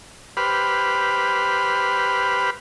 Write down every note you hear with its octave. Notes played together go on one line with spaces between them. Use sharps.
G4 B4 C5 B5 F6